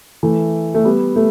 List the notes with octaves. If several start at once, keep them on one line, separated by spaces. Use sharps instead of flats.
E3 A3
A3
G3 B3
A3